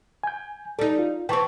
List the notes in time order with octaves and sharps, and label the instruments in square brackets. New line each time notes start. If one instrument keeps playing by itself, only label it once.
[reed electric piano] G#5 G6
[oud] G3 D#4 [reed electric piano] A4
[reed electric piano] F4
[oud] E3 C4 [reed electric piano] G5 A5 C#6